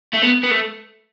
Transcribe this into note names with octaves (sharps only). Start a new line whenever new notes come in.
A3
B3
B3
A3